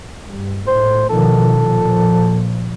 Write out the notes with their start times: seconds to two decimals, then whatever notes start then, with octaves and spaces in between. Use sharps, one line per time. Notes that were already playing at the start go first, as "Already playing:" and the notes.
0.25 G2
0.67 A2 C5
1.09 B2 D#3 F3 A4
1.56 A#2 F3